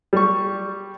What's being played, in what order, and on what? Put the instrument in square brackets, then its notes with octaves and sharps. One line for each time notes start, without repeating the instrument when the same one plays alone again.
[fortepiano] G3 C#6